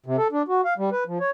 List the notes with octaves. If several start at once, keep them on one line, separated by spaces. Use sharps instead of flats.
C3
A4
D4
F#4
F5
G3
B4
F3
C#5